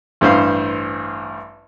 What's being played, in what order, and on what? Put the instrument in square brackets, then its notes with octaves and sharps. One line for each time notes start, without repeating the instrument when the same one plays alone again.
[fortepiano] A1 G2 C5 F5